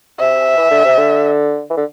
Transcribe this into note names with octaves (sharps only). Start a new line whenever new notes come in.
C3 E5
E3
D3
C3
D3
E3
D3